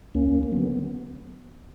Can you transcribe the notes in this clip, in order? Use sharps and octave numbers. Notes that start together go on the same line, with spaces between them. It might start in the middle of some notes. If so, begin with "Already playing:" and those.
D2 A#3 C#4
A#3
D3 F#3 B3